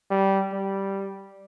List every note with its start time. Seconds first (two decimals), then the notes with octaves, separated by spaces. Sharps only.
0.11 G3
0.52 G3